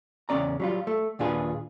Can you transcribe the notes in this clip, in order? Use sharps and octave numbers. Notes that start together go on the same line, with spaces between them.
E2 C#3 C4 C#4 D5 A#5
F#3 G3 F4
A3
D#2 A#2 D4 F4 G#4 B4